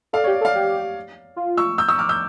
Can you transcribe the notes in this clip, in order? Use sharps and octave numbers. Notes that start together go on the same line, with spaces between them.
A4 D5 F5
G4 C#5
D5
A4
D5 F5
G4
F4
C#6 E6
E6 G6
C#6 E6
D6 F6
E6 G6